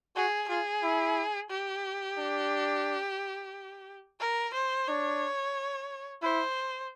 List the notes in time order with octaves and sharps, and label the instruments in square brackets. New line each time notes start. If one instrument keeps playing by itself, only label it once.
[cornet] F#4 [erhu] G#4
[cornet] F4 [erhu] G#4
[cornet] E4
[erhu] G4
[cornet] D4
[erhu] A#4
C5
[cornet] D4 [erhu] C#5
[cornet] E4 [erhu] C5